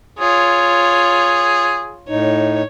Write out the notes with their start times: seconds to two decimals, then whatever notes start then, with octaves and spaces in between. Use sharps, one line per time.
0.19 F4 G#4 C#5
2.08 A2 D#4 C#5